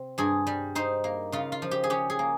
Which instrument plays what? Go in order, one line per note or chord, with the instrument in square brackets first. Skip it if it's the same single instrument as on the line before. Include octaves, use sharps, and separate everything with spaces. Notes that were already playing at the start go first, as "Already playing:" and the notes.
Already playing: [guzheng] C3 C4
G2 G#4
G3
D#4 C5
A#3
C#3 F4
F4
F3
G4
G#4
C#4 G4
G#4
A#3